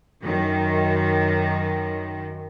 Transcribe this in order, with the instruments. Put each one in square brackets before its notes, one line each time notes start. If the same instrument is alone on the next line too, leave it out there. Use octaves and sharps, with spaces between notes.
[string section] F#2 D#3